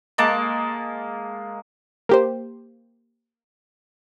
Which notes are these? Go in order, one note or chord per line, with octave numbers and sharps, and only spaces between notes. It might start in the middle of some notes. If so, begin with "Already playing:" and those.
G#3 A#3 A5
A#3 G4 C5